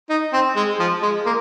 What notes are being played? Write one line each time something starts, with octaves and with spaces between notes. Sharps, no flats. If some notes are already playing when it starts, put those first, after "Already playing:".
D#4
C4
G#3
F3
G#3
A#3